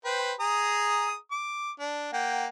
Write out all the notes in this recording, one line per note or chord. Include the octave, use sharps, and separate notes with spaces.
B4 C5 G5
G#4 A#5 D#6
D6
D4
A#3 F#5 G5